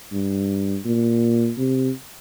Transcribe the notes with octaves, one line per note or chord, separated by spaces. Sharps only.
G2
A#2
C3